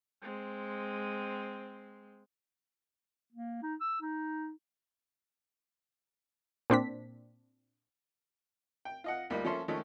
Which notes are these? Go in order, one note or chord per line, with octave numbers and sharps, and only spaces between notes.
G#3 C4
A#3
D#4
E6
D#4
A#2 C4 D4 B6
G5
F4 D#5 F#5
D2 G3 A#3 D#4 F4
F3 A#3 C#4 A4 E5 C6
D#3 F3 G#3 A3 C#4